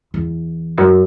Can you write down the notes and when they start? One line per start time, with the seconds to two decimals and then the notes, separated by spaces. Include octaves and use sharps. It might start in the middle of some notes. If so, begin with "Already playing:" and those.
0.14 E2
0.77 F#2